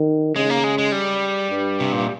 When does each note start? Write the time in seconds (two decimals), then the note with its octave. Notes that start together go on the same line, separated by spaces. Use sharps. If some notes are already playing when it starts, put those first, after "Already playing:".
Already playing: D#3
0.35 C#3 G#3
0.50 A#3
0.64 G#3
0.78 G#3
0.92 G3
1.50 G2
1.80 C3
1.93 A#2